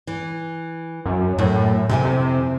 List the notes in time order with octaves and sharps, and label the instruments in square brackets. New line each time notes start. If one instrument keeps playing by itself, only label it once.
[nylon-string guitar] E3
[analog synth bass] F#2
[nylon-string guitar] F#2 [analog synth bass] A2
[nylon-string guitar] F2 E4 G#5 [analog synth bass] C3
[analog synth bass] C3